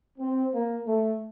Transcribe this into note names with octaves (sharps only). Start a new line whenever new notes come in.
C4
A#3
A3